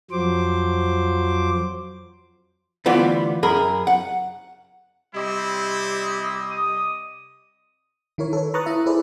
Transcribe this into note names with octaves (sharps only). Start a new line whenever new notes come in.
F2 F3 F#3 C5 D6
D2 E3 G3 B3 F4
F#2 G#4 A#4 B5
F#5
C3 G3 C4 E4 D5 D#5
D#6
D#3 E4 A#4 C#5
A4 B4 C#5
B4 A#5 C#6 D#6 F#6 A6
E4 E5
E4 G#4 A4 B4 C5 D5